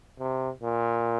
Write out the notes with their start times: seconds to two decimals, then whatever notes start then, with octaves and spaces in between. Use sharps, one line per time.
0.20 C3
0.63 A#2